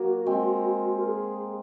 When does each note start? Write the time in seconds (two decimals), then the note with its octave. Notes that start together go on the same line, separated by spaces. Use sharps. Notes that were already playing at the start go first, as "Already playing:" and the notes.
Already playing: F#3 A#3 F#4
0.26 G#3 C4
0.99 A#4
1.08 G#4